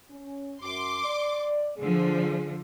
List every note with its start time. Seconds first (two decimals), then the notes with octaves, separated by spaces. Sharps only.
0.11 C#4
0.61 F#2 C6 D6
1.04 D5
1.78 D3 F3 G#4